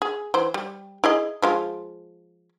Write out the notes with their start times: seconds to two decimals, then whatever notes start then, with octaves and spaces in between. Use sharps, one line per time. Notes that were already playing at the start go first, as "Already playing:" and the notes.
0.02 G#4
0.34 E3 C5
0.54 G3
1.04 E4 G#4 D#5
1.42 F3 G#3 F4